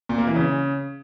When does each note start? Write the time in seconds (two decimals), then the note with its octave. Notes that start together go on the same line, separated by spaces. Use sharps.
0.09 A#2
0.18 A#3
0.27 E3
0.36 C#3